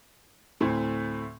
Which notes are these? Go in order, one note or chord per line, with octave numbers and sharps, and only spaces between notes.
D2 A2 A3 C4